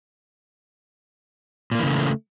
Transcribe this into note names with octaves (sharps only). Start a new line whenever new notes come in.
A#2 C#3 E3 A3 A#3